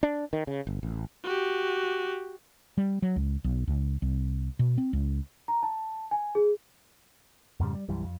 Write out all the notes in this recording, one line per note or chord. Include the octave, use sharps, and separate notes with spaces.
D4
D#3
C#3
G1
A1
F#4 G4
G3
F#3
C#2
B1
C#2
C2
B2
C4
C#2
A#5
A5
G#5
G#4
F2 G#2 C#3 G3
G3
B1 F#2 E3 G3
F2